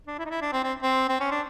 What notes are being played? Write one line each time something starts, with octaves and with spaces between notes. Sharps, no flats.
D4
E4
D#4
E4
D4
C4
C4
C4
C4
C#4
D4